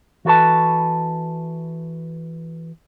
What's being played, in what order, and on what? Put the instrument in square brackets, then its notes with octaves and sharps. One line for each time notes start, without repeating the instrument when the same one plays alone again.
[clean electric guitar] E3 F#4 A4 B4 A5